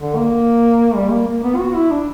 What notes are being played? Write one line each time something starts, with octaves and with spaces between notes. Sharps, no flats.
D3
A#3
G3
A#3
A#3
B3
F#4
E4
D4